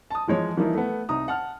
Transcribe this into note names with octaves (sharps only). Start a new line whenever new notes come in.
A5 D#6
E3 F3 G#3 C#5
E3 F3 G3 A#3 D#4 E4
A3 B3
C2 D#4 A#5 D#6
F#5 A5 F6